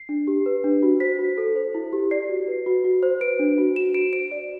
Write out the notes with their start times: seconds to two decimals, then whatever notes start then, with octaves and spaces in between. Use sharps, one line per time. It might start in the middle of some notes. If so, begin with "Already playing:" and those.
Already playing: C7
0.09 D4
0.27 G4
0.46 B4
0.64 D4
0.83 F#4
1.00 C5 B6
1.19 F#4
1.38 A4
1.56 C5
1.75 E4
1.93 G4
2.11 D5 C7
2.29 F#4
2.48 B4
2.66 F#4
2.84 F#4
3.03 C5
3.21 B4 D7
3.39 D4
3.58 F#4
3.76 F#4 E7
3.94 F#4 D7
4.12 C5 D7
4.31 D5